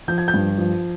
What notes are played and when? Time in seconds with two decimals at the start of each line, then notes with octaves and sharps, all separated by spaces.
0.08 F3 G6
0.18 G#6
0.28 G6
0.34 G2
0.58 F3